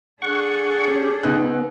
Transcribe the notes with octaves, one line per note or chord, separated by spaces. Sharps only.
D4 G#4 A4 F#5 C#6
C#4 G4
C#2 B3 D#4 F#6